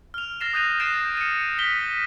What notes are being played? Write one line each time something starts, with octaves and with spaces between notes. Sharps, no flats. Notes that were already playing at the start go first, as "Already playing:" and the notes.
F6 F7
F6 A6 A#6 C7 E7
D#6 F#6 G6 A#6 D#7 F7
G6 A6 A#6 C7 D7 E7
C#7 D#7
G6 B6 G7